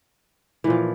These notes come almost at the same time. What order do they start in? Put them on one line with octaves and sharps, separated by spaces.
E3 A#2 F3